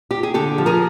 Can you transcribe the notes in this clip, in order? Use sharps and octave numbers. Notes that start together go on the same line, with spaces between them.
G4
G#4
D3 G4 A4
F3
G#4 A#4